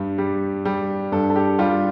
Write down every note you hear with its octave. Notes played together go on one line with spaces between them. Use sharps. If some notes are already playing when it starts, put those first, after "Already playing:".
Already playing: G2 G3
G3
G3
G2 A4
A4
G4
G3 F4